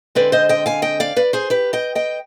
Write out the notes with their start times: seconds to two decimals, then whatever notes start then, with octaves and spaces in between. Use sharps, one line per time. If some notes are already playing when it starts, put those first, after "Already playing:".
0.15 D3 G#3 C4 B4 D5
0.32 C5 D#5
0.49 D#5 G5
0.66 F5 G#5
0.82 D#5 G5
1.00 D5 F5
1.16 B4 D5
1.33 G#4 C5
1.50 G4 B4
1.73 D#5 G5
1.95 D#5 G5